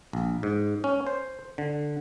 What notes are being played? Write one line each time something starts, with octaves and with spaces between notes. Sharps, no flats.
A#1
G#2
C#4
C5
D3